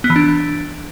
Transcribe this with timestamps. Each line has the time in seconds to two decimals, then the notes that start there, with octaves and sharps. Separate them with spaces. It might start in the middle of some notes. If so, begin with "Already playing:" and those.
0.04 B3
0.10 E3
0.16 D4